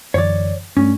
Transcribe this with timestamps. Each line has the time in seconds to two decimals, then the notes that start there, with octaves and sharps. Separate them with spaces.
0.14 F#2 D3 E3 C#5 D5
0.77 G2 A3 C#4 D4